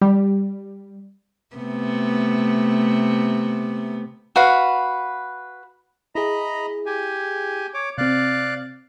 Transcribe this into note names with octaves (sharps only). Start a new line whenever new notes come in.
G3
C3 A3 B3
F#4 B4 F5
E4 G#4 D#5 A#5 B5
G4 G#5
C#5 D6
C3 C4 D5 F5 F#6